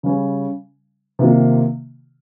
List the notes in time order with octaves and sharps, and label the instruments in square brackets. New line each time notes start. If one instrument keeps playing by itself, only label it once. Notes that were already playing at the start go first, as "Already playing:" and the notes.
[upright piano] C#3 G3 C#4
C3 D#3 A#3 F4